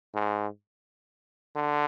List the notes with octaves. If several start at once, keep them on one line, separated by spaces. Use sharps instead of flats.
G#2
D3